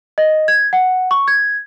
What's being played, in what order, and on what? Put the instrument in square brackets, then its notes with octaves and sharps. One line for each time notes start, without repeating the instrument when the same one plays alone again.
[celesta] D#5
G#6
F#5
C#6
G#6